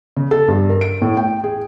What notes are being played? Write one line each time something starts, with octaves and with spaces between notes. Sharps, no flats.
C#3
A4
G2
A#4
D7
A2
G5
G#4